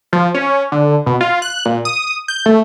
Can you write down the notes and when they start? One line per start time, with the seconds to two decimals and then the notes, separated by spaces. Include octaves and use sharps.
0.13 F3
0.34 C#4
0.72 D3
1.06 B2
1.21 F4
1.42 F#6
1.66 A#2
1.85 D#6
2.28 G6
2.46 A3